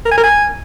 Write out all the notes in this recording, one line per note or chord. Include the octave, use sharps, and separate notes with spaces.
A#4
G#5
A#4
G#5